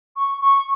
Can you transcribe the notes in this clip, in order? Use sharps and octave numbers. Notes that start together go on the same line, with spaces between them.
C#6
C#6